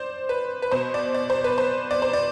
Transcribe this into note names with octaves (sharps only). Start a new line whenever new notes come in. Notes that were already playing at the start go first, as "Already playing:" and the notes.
Already playing: C5 D5
B4
B4
B2 C5
D5
D5
C5
B4
C5
D5
C5
D5